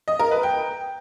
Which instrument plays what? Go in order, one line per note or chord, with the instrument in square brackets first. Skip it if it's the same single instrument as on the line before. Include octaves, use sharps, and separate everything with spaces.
[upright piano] D#5
A#4
B4
G5